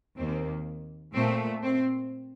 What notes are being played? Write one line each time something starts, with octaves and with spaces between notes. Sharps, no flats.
D#2 D#3 A#3 C4
A#2 A3 C4
C4